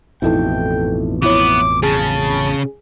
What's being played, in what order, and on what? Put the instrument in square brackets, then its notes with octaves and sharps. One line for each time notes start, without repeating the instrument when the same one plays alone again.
[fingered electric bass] A1 F2 B2 [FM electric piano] D#4 E4 A4 [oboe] G5
[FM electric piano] F3 E4 C#5 [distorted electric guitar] B3 [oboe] D6
[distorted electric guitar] C#3 [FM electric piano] G#4 [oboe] A5